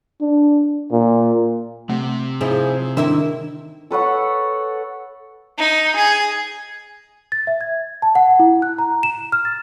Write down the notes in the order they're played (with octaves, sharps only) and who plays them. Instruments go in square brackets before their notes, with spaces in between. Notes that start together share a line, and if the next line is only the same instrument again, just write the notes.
[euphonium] D4
A#2
[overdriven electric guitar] C3 [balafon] A3
[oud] F3 D#4 E4 [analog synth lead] G#4
[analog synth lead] D#3 [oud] A#3 E4 E5 [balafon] D4
[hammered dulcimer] A4 B4 C#5 F#5
[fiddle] D#4
G#4
[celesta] A6
E5
G#6
A5
F#5
E4
F#6
A#5
E7
F6
A6